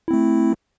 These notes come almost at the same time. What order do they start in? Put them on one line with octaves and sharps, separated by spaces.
E4 C4 A3